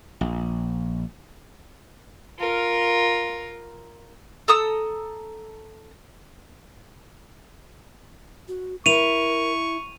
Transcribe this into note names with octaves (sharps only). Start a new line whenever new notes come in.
A#1
F4 A#4
A4 A#5 D#6 E6
F#4
E4 A#4 C#6 D#7 F7